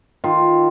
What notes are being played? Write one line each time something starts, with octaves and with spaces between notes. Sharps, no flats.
D#3 F4